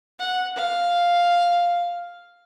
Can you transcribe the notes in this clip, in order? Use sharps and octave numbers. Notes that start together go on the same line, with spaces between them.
F#5
F5